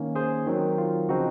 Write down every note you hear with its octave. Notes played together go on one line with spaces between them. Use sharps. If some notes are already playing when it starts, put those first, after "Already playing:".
Already playing: D#3 A#3 C#4
G#4 C5
D#3 F#3 C4
F4
C#3 F3 C4 D#4 F#4